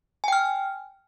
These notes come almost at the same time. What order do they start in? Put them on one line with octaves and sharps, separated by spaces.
G#5 G5 F6